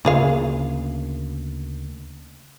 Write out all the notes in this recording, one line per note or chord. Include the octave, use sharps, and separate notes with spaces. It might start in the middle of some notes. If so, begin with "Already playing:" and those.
D2 C#3 A#3 F4 G#4 F5